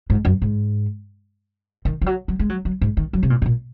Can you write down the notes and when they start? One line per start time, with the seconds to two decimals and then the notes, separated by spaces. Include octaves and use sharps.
0.10 G#2
0.25 F#2
0.42 G#2
1.85 D#3
2.02 F3
2.06 F#3
2.28 F#3
2.39 G#3
2.50 F#3
2.65 F#3
2.81 G#2
2.97 D#3
3.13 F#3
3.23 C3
3.30 A#2
3.42 G#2
3.46 A#2